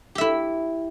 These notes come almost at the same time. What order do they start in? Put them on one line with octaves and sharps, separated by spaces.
G4 E5 E4